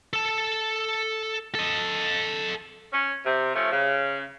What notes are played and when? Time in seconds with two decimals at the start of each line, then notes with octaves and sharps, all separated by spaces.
0.13 A4 A5
1.55 A4 D#5
2.93 C#4
3.26 C3
3.55 F3 A3 C#4
3.72 C#3